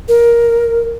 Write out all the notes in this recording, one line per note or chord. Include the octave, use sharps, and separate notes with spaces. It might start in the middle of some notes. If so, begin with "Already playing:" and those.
A#4